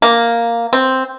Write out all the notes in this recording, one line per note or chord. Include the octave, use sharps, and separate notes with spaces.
A#3
C4